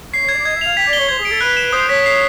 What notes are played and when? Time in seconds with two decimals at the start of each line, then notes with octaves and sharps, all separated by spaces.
0.13 C#5 C7
0.24 C#5
0.29 G#6
0.34 D5
0.45 D#5 G#6
0.56 E5
0.61 F5 F7
0.77 G5 B6
0.87 D5
0.93 G7
0.99 C#5
1.08 C5 G#6
1.20 G#4
1.25 D7
1.31 A4
1.41 B4 F#6
1.57 E7
1.73 C5 D#6
1.89 C#5 B6
2.06 C7